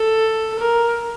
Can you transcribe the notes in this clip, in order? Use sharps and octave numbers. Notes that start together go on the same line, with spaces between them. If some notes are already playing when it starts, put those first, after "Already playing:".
Already playing: A4
A#4